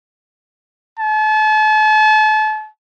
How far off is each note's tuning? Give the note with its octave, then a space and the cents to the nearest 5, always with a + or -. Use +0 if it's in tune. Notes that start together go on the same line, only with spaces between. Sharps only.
A5 -35